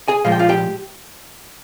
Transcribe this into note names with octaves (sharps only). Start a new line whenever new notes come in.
G#4 G#5
A#2 F3 G#3 F5
G5
F4 F5
G4 G5